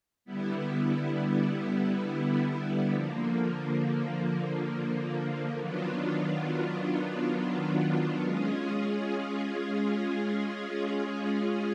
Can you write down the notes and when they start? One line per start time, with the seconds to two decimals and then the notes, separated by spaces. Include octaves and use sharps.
0.25 D3 G3 B3 E4
2.91 D3 F3 A#3
5.57 D#3 F#3 B3 D4 F4
8.22 G#3 C#4 F4 G#4